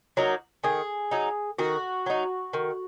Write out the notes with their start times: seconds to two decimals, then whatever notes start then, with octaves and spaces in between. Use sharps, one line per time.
0.17 F#3 A#3 D#4
0.64 D#3 G#4
1.11 F#3 D#4
1.59 D#3 F#4
2.06 F#3 D#4
2.53 D#3